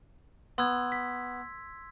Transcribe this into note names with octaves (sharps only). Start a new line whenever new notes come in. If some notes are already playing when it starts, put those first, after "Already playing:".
B3 C6 E6 G#6
B6